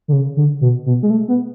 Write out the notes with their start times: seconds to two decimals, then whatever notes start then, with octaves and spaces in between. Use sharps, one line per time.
0.08 D3
0.13 C#3
0.37 D3
0.61 B2
0.86 B2
1.03 G#3
1.10 A3
1.28 B3